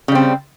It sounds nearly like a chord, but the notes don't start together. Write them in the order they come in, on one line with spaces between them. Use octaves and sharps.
C#3 G3 C4